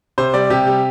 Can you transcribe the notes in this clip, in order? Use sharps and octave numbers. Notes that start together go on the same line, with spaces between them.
C3 C5
G3 D5
C3 G4
G3